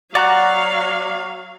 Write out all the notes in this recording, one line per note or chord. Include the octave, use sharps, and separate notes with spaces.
F#3 F#4 D5 F5 A#5 F#6